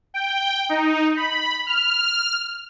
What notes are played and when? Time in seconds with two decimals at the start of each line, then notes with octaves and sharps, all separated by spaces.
0.14 G5
0.69 D#4
1.17 B5
1.67 F6